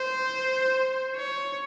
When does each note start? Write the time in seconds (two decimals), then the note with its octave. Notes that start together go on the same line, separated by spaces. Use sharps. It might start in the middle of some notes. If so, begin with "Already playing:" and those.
Already playing: C5
1.16 C#5